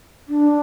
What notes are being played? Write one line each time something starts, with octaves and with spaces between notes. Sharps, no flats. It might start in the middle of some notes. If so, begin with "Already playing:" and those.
D4